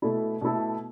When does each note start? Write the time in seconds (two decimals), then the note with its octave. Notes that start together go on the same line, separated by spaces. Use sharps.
0.02 B2 A3 E4 A4
0.41 B2 A3 E4 A4